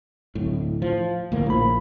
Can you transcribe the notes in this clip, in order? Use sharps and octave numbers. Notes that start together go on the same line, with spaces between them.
D1 A2
F3
D2 A2 A#3
A#1 F3 A#3 B5